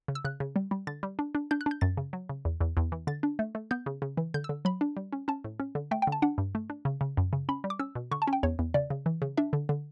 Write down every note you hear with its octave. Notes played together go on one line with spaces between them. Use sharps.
C#3
E6
C#3 F#6
C#3
G3
G3
D3 A6
G3
D4
D4
D4 G6
F#6
D4 G6
F#2 A6
C#3
F#3
C#3
E2
E2
E2
E3
D3 A6
D4
A3
A3
B3 G6
C#3
C#3
E3
D3 G6
E6
D3
F#3 B5
D4
G3
C#4
C#4 A5
A2
C#4
D3
A3 G5
G5
D3 A5
D4 F#5
G2
A3
D4
C#3
C#3
F#2
C#3
C#4 B5
G3
D6
C#4 E6
B2
D3 C#6
A5
C#4
G5
E2 C#5
E2
C#3 D5
C#3
E3
C#3
D4 E5
D3
D3